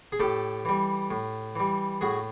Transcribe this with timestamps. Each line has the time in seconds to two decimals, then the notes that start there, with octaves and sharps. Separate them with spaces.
0.12 G#4
0.20 A2 G4 A4
0.65 E3 G3
1.11 A2
1.56 E3 G3
2.01 A2 F#4 G#4